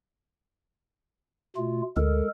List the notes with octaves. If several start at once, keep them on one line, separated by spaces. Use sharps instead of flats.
B2 A3 F4
D2 G#3 A4 A#4